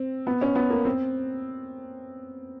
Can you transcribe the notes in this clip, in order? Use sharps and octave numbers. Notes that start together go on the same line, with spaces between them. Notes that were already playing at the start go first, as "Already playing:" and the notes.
Already playing: C4
B3
C#4
B3
A#3
C4